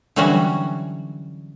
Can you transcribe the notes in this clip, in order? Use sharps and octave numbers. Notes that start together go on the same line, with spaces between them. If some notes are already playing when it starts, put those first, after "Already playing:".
D3 E3 F#3 G3 C#4 F#4